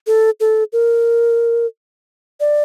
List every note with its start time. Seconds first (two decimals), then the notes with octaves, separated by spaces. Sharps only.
0.07 A4
0.40 A4
0.73 A#4
2.40 D5